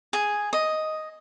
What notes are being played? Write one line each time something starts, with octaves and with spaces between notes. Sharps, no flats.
G#4
D#5